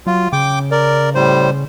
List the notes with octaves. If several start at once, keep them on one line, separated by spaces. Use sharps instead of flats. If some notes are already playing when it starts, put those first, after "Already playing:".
F#3 F4
C#3 G5 D6
A#4 D5
A2 G3 C5